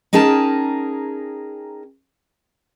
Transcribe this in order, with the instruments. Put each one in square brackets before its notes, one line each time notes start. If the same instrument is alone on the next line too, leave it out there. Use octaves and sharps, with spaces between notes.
[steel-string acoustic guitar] C#4 D#4 G#4 A#4 G5 A5